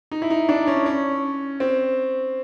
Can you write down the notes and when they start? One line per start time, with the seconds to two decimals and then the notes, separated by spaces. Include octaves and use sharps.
0.11 D#4
0.22 E4
0.30 D#4
0.49 D4
0.67 C#4
0.86 C#4
1.60 C4